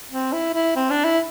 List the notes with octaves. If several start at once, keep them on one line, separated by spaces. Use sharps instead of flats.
C4
E4
E4
C4
D4
E4